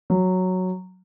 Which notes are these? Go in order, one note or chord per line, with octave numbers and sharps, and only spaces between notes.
F#3